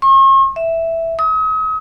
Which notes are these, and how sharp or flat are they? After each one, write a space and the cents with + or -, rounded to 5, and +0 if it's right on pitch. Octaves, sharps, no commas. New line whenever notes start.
C#6 -45
E5 +0
D#6 +40